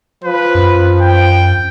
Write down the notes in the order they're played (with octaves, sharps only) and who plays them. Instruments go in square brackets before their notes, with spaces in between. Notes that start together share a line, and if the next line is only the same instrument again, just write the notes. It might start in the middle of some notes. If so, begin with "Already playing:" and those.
[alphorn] F3 [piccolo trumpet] B4
[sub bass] F#2
[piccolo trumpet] G5